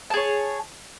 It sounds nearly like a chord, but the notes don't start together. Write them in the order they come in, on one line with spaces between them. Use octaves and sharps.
A5 G#4 C#5